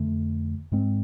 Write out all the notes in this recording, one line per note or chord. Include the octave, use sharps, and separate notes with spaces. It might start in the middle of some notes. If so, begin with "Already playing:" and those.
Already playing: F2 D3 A3
G#2 G#3 C4